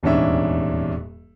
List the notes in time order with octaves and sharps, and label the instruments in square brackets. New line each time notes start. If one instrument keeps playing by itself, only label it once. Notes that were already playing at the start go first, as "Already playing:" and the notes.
[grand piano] D#1 E2 G#2 C#4 D4 E5